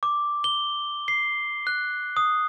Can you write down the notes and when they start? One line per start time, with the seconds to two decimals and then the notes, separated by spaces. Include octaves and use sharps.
0.03 D6
0.44 G7
1.08 C7
1.67 F#6
2.17 D#6